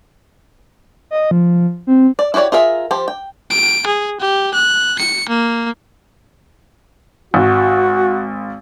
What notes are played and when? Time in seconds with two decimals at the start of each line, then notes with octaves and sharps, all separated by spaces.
1.11 D#5
1.31 F3
1.87 C4
2.19 D5
2.34 E4 F#4 G4 C#5 D5
2.52 F4 G#4 A#4 E5
2.91 F3 G4 C5
3.08 G5
3.50 D7
3.87 G#4
4.20 G4
4.54 F#6
4.99 C#7
5.29 A#3
7.34 G#1 F#4